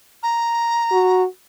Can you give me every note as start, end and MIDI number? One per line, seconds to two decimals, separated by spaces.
0.23 1.23 82
0.92 1.25 66